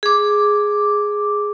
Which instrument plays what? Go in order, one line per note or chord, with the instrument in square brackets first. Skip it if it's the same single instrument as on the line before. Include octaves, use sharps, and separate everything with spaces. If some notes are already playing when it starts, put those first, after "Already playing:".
[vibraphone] G#4 D6